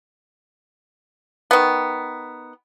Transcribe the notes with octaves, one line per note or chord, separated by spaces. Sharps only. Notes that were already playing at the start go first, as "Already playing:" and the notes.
D#3 B3